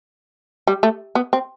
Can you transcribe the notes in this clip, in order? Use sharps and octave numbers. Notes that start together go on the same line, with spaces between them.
G3
A3
B3
C4